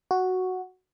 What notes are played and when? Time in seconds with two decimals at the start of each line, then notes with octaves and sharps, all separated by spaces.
0.11 F#4